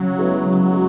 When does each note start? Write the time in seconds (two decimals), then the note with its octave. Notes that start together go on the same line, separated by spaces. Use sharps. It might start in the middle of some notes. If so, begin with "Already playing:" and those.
Already playing: C#3 F#3
0.18 G#3 B3 E4 G#4
0.46 C#3
0.73 G#3